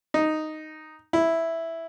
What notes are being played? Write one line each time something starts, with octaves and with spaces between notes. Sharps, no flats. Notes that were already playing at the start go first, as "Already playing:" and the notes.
D#4
E4